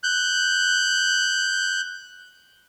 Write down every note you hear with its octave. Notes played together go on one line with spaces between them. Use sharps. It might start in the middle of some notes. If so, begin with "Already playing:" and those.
F#6 G6